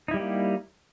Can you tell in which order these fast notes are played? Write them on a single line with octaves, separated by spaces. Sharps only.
D#4 E4 G3 G4 A#3